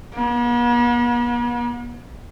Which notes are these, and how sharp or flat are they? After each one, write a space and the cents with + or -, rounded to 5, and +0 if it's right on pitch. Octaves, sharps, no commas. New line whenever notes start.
B3 -45